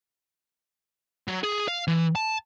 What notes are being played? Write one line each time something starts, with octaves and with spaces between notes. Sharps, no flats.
F#3
G#4
F5
E3
A5